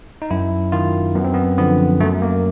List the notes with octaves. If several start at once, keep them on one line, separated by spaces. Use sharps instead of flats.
D#4
F#2 E4
D#3 F4
F#2 B3
C4
B3
D3 F3 B3
F#2 A3
A#3